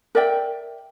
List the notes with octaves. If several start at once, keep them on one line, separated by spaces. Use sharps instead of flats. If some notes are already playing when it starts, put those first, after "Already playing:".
A#4 D5 E5 G5